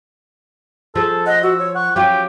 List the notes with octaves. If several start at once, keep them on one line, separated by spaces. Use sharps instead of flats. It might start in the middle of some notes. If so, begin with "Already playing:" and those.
F3 G#4 A4
D#5 F#5
F#4 E6
C#5
F#5 C#6
F#3 C#4 F4 G4 G5